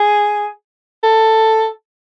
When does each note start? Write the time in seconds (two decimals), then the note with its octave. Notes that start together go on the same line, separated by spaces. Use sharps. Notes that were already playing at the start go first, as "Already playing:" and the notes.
Already playing: G#4
1.03 A4